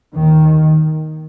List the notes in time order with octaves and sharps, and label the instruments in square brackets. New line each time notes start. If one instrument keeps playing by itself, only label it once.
[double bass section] D#2 D#3